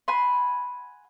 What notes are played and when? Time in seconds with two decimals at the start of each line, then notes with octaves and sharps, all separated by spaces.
0.08 F#5 G#5 B5 C6